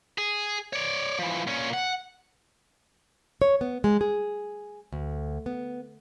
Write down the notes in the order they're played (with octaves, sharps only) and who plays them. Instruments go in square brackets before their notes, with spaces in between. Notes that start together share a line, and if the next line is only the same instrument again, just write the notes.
[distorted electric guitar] G#4
C#5 D5
E3 F3
A#2 C#4
F#5
[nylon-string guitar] C#5
B3
G#3
G#4
D2
B3